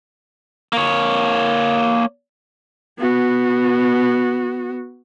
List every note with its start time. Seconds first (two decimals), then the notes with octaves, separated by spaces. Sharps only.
0.73 A#3 C#5
2.99 B3 F#4